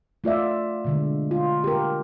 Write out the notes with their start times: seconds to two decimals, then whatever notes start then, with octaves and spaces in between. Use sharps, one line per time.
0.24 A3 F4 D5 E5
0.85 B2 D3 G#3
1.31 F4
1.64 G4 A#4